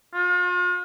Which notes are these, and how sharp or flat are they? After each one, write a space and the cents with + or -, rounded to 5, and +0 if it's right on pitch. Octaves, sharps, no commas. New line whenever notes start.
F4 +40